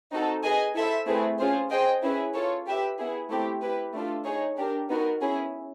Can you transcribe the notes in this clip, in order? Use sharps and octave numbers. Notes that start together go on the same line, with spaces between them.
C4 D#4 F#4 A4
G#4 B4 D#5 G#5
E4 A4 C5 E5
A3 C4 E4 G#4 B4
C#4 F4 G#4 C5
G#4 C5 D#5 G5
C#4 E4 G#4 B4
F4 A4 C#5
G4 B4 E5
B3 E4 G#4
A3 C4 E4 G4
E4 G4 B4
A3 D4 F4 A4
D#4 G#4 C#5
D4 G4 A#4
B3 D#4 F#4 A#4
C#4 E4 G#4